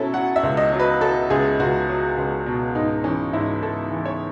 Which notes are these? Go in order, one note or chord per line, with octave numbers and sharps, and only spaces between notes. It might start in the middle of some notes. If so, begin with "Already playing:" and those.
Already playing: B2 F#3 C#4 E4 A4
F#3 F#5
E5
C#2
D#5
F#3
B4
F#3 A4
C#2 G#4
C#2 F#4
F#3
C#2
B2
G#2 D#4
E3 C#4
G#2 E4
G#2 A4
E3
C#5